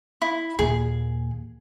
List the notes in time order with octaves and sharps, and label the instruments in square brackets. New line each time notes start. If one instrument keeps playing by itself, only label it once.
[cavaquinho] E4
[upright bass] D#2 A#2 [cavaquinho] G#4